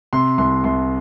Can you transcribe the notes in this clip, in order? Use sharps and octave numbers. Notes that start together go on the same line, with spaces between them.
C3 C6
C2 C6
C2 C6